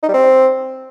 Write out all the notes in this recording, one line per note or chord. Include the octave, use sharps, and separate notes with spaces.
D#4
G3
C4